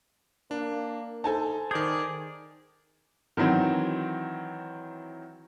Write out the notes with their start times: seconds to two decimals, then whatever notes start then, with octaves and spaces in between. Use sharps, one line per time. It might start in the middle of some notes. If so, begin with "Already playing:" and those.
0.51 A#3 D4
1.24 D#4 A4 C5 G#5 A5
1.71 D#3 G#4 D5 G6
3.37 D#3 E3 F#3 C4